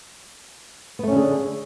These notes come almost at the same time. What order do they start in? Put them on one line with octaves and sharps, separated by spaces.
B3 A3 C#4 D3 G#4